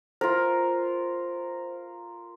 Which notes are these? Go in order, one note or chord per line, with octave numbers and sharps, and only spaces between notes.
F4 A#4 C5